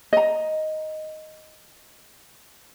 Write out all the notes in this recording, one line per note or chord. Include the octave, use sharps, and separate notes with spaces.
D#5 A#5